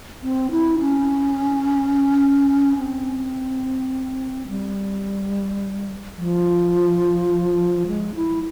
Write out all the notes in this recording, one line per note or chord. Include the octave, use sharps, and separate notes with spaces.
C4
E4
C#4
C4
G3
F3
G#3
E4